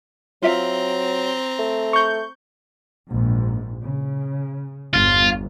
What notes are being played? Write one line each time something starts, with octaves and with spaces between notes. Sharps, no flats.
F#3 C4 F4 E5 F5 A#5
A3
C#6 G6
A#1 G#2
C#3
G1 E2 F4